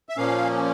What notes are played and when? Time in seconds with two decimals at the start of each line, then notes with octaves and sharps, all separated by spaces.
0.09 E5
0.17 A#2 F3 A#3 C#4 F5